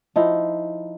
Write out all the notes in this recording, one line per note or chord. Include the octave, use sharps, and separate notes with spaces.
F3 D#4 E4